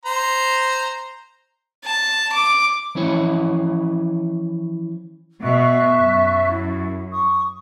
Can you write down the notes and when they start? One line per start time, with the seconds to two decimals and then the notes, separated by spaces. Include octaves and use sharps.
0.05 C5 A#5
1.85 A5
2.33 D6
2.95 E3 F3 C#4 E4 C#5 E5
5.42 B2 E5 C#6 F#6
5.99 F#2
6.51 E4
7.12 C#6 D#6